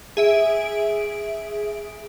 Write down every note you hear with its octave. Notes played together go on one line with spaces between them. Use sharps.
G#4 E5 D7